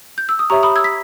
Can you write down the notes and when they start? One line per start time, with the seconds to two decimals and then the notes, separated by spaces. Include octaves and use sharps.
0.18 G6
0.29 E6
0.39 D#6
0.50 G4 C#5 E5 A#5 C#6
0.63 B5 D#6
0.76 E6 G#6
0.84 B6